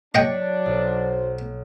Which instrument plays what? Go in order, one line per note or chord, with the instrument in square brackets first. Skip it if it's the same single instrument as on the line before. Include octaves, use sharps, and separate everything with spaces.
[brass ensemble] F#3 D4 [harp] C#5 B6 [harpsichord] D#5 F#5 G5
[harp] B1 [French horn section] F#4 C5